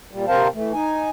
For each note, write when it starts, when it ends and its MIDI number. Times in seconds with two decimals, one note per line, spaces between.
0.11 0.25 46
0.11 0.25 55
0.28 0.48 48
0.28 0.48 60
0.28 0.48 70
0.28 0.48 72
0.28 0.48 77
0.28 0.48 81
0.54 0.72 52
0.54 0.72 57
0.73 1.10 63
0.73 1.10 80